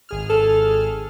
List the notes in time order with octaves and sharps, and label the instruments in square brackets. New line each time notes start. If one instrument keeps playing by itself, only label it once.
[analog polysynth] G#1 G#4 F6
[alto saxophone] A4